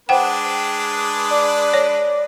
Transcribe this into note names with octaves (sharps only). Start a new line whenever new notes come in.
G#3 D4 B4 C5 F#5 G5
D5
C#5